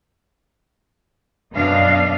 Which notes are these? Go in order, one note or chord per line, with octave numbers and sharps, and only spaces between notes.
F#2 B2 D4 D#5 F5